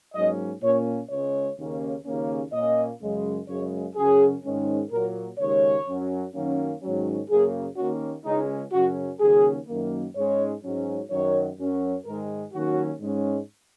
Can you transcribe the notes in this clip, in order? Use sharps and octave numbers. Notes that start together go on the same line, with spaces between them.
G#2 F#3 A#3 C#4 D#5
A#2 A#3 C#4 C#5
C#2 C#3 G#3 C#4 C#5
D#2 C#3 A#3 C#4
D#2 C#3 A#3 C#4
A#2 A#3 C#4 D#5
F#2 C#3 G#3
F#2 C#3 G#3 C#5
F#2 C#3 F#3 C#4 G#4
G#2 D#3 G#3 C#4
A#2 F#3 A#3 A#4
D#2 C#3 G#3 C#5
F#2 F#3 C#4
F#2 D#3 F#3 A#3 C#4
G#2 D#3 F#3 C#4
F#2 C#3 A#3 G#4
D#2 D#3 A#3 C#4 F#4
C#2 C#3 G#3 C#4 D#4
F#2 C#3 F#3 C#4 F#4
D#2 C#3 F#3 C#4 G#4
F#2 D#3 A#3
G#2 G#3 C#4 C#5
G#2 F#3 C#4
F#2 D#3 F#3 C#5
F#2 F#3 C#4
G#2 D#3 G#3 A#4
D#2 D#3 F#3 C#4 F#4
G#2 G#3 C#4